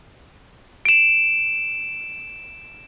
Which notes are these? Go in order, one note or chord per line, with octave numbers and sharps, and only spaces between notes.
D7 E7